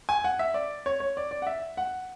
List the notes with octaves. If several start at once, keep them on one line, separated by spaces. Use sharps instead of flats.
G#5
F#5
E5
D5
C#5
C#5
D5
D5
F#5
E5
F#5